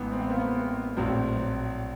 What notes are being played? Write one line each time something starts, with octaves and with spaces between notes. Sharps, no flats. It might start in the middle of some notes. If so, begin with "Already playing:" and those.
Already playing: A1 G#2 E3 B3
C4
B3
A#3
B3
A#1 A2 F#3 C4